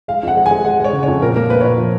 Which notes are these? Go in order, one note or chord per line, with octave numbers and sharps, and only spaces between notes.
G#3 F5
F2 F#5
G#3
G#5
G#3
G#3 F#5
G#3 C#5
C#3
C#5
F2
A#2 A#4
A#3 A#4
A#3 B4
C#5
A#2 B4
F3